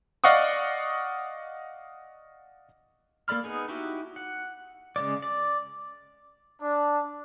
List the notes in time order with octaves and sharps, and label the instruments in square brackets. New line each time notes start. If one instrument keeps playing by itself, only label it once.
[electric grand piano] D5 D#5 F5 F#5 C#6 D#6
[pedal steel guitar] A#3 A4 D5 B5 F6
B3 D#4 G#4
D#4 E4 F#4 G4
F#5
C#3 G#3 D5
D5
[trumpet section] D4